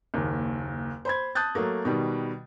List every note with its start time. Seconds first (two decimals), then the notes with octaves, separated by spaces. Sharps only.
0.14 F#1 D#2
1.05 C5 B5 G#6
1.35 A5 D#6 F#6 G6 A6
1.55 F#3 A3 A#3
1.85 B2 D#3 G3